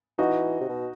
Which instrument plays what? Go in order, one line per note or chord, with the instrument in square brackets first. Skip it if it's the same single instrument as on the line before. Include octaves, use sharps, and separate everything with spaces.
[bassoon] E3 [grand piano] D#4 F#4
[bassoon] C3
B2